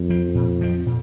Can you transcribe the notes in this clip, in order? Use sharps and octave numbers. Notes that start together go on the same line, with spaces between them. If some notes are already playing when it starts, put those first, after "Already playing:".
Already playing: F2
F3 C4
A#2
F3 C4
A#2